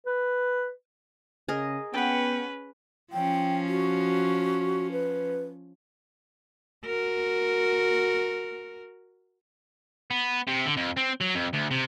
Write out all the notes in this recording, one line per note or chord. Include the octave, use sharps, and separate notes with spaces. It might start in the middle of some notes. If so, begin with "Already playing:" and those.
B4
C#3 G#4 A#4 D#5
B3 C#4 B4 F#5 G5
F3 C#4 G5
F#4
B4
F#4 A#4
B3
C3
D3
F2
C4
F#3
F2
D2
C3